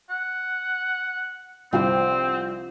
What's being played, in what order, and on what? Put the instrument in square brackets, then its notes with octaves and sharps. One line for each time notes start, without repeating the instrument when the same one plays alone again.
[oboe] F#5
[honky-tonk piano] C2 F4 G5 [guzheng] F3 B3 D4 [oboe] C4